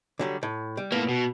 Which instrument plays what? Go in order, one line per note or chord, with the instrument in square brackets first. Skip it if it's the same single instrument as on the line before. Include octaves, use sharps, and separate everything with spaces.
[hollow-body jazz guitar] D3 F#3 G3
A2
G3
[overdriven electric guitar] A2 A#3 [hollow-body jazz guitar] B3
[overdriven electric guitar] B2